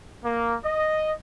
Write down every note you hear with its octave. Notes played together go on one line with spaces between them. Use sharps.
A#3
D#5